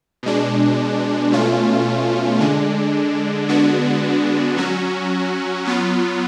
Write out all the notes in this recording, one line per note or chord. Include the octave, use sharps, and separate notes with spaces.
B2 G#3 D4
B2 A3 C#4 F4
D3 G#3 D4
D3 G#3 B3 D4 F#4
F#3 C#4 F#4
F#3 B3 F4